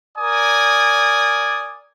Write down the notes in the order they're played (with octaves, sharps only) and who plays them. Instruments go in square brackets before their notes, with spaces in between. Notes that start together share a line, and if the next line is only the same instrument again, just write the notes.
[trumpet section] A#4 D5 G#5 D#6